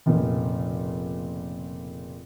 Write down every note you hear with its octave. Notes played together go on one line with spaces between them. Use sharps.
F1 A#2 C#3